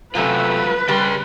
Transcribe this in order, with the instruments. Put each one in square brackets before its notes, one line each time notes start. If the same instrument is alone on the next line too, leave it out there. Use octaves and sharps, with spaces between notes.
[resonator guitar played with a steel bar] F#2 C3 A3 [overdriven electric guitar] F#3 F4 [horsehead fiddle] B4
[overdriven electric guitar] C#3 C6 [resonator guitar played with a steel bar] G3